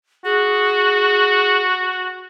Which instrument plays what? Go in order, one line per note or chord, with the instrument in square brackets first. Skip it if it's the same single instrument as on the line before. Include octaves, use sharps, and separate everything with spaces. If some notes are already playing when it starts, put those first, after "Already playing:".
[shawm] F#4 [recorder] G#4